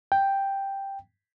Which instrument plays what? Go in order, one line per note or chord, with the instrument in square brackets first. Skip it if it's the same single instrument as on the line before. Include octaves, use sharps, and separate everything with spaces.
[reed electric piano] G5